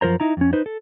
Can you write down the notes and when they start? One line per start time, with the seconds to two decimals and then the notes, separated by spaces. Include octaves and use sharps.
0.01 F#2 F3 A#4 C5 A#5
0.20 D#4 E4 A#5
0.37 F2 C#4
0.53 D#4 B4 C5
0.66 A4